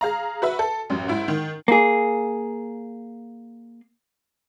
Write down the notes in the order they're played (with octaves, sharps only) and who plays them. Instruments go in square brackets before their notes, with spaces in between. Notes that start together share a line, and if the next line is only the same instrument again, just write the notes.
[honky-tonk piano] G#4 F5 A#5
F#4 B4 E5
A4
A1 F#2
G#2 E4
D#3
[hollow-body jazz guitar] A#3 G#4